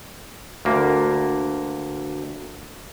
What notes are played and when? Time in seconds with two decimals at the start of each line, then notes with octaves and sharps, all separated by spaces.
0.65 D2 A#3